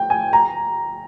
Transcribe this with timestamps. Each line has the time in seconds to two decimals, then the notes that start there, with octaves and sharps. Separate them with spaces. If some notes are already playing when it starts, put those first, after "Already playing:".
Already playing: G5
0.10 G#5
0.33 A#5